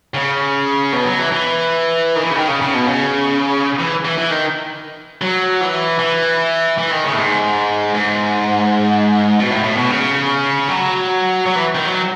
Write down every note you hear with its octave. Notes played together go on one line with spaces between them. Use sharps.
C#3
B2
F#3
E3
E3
D#3
E3
C#3
D#3
C#3
C#3
B2
C#3
E3
E3
E3
D#3
F#3
E3
E3
E3
D#3
C#3
A2
G#2
G#2
B2
A2
A2
B2
C#3
F#3
F#3
E3
D#3
F#3